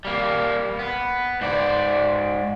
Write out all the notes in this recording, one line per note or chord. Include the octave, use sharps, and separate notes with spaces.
G3 A#3
B3
G#2 D5